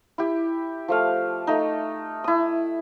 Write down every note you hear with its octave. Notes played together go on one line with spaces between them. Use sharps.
E4 G4
F3 A3 F5
A3 D#4
E4 D#6